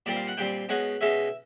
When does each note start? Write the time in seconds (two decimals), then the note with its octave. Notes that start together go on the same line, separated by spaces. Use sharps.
0.06 A#2 G3 C4 D5
0.16 F5
0.28 F#5
0.37 A#2 G3 C4 G5
0.69 B2 G#3 C#4 F#5
1.01 B2 G#3 C#4 E5